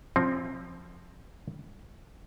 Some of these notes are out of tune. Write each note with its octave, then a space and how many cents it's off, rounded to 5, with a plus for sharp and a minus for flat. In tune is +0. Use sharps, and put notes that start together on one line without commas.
F3 +0 C4 +15